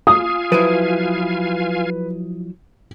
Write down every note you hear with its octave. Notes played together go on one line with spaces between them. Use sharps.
F4 F5 G#5 D#6
F3 F#3 E4 B4 D#7